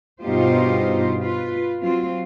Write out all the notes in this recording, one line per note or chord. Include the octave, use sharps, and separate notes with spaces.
G2 B2 D#4 F4 G4 C5
F4 B4
F#3 C4 F4